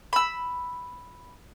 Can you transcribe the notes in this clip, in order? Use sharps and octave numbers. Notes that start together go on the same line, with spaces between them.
B5 E6